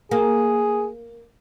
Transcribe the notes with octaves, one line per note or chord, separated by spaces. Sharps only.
A#3 G#4